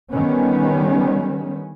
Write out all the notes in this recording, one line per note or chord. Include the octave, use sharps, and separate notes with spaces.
D3 D#3 G3 B3 C#4